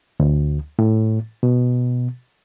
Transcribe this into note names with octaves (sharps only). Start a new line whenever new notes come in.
D2
A2
B2